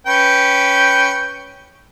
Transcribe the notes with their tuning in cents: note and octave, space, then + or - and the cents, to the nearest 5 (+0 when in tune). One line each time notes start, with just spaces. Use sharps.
C#4 +5 B4 +0 G5 +0